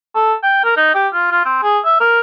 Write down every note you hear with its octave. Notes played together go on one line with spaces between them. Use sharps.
A4
G5
A#4
D#4
G4
F4
F4
C4
G#4
E5
A#4